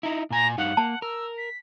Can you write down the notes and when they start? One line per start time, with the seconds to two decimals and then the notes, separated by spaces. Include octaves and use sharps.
0.03 D#4 E4 A#5
0.30 A#2 G#5 A#5
0.58 G2 D#4 F5 F#5
0.77 A#3 A5
1.02 A#4 E6
1.37 B6